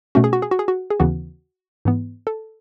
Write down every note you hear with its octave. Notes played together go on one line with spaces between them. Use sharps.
B2 A3 C#4 F#4
G#4
F#4
G#4
F#4
G#4
F#4
G#4
D#2 C#3 E3 B3 F#4
G#2 E3 B3
A4